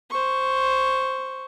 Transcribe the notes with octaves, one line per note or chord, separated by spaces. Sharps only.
C5 C#6